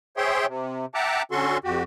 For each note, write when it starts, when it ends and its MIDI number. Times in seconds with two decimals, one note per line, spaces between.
0.17 0.46 68
0.17 0.46 72
0.17 0.46 73
0.17 0.46 76
0.17 0.46 79
0.17 0.46 84
0.47 0.86 48
0.95 1.22 76
0.95 1.22 78
0.95 1.22 79
0.95 1.22 81
0.95 1.22 82
0.95 1.22 86
1.32 1.58 50
1.32 1.58 61
1.32 1.58 66
1.32 1.58 69
1.32 1.58 84
1.32 1.58 85
1.64 1.83 41
1.64 1.83 66
1.64 1.83 67